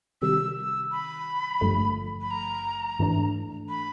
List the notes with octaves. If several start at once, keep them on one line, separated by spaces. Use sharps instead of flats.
C3 D#3 G3 E6
E6
B5
G#1 G2 D3 F3 A3
B5
A#5
G#2 E3 A3 D4
B5